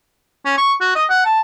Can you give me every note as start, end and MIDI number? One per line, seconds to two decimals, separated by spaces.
0.45 0.53 61
0.57 0.74 85
0.81 0.94 66
0.95 1.04 75
1.10 1.24 78
1.25 1.41 81